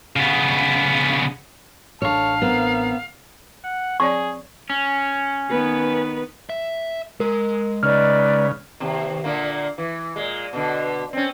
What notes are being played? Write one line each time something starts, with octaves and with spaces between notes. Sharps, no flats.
C#3 B3
A1 C#4 D4 A4 C#5 F5 A5
B3 C4 A#4
F#5
C4 G#4 C#5 D5 C#6
C#4
D#3 B3 B4
E5
G#3 A#4
C#3 D#4 B4 D5 F6
D#2 C3
A#2 D3 A#3
E3
A#2 G#3
B2 D3
C4 C#4